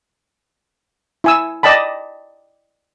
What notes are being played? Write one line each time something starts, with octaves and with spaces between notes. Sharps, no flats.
E4 G#5 E6
D5 D#5 G5 A5 B5